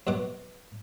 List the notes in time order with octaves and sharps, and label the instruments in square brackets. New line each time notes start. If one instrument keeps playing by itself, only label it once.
[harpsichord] F#2 B2 D#5 D6